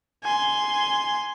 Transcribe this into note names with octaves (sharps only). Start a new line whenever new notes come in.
G#5 C6